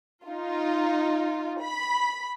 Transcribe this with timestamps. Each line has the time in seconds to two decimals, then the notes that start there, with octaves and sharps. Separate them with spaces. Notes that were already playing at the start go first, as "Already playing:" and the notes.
0.24 D#4 F4
1.60 B5